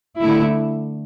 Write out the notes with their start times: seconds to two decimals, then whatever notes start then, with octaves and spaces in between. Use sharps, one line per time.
0.20 D3 A3 E4